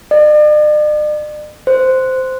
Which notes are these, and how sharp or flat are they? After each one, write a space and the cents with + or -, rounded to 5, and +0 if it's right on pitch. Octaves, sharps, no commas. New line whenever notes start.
D5 +45
C5 -10